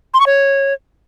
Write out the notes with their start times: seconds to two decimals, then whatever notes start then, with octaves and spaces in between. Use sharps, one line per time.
0.14 C6
0.20 C#6
0.26 C#5